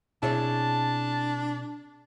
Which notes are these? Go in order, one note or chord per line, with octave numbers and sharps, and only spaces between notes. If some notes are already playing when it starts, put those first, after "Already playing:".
B2 C4 D4 E4 G#4 C#5 A5